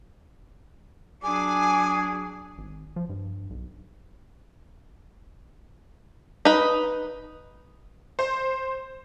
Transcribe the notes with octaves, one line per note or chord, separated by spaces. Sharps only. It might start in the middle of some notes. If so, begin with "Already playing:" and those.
F#3 D4 G#4 G#5 D6
G#1
F3
G2
B1
D#4 B4
C5